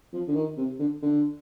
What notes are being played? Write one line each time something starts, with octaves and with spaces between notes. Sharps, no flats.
F3
D3
D#3
C3
D3
D3